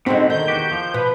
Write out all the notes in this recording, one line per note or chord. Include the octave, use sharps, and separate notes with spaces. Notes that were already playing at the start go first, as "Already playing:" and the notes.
B2 D3 G#3 C4 D#4 F#4
D#3 G6
E2 F#4 G4
F3
B2 B4